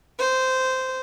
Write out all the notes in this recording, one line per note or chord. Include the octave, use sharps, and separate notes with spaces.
C5